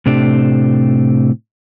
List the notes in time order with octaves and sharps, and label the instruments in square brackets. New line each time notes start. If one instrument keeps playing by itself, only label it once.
[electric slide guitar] A2 C3 A3 C4 D4 G4